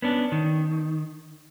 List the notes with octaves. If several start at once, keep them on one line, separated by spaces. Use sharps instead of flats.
B3 C#4 D4
D#3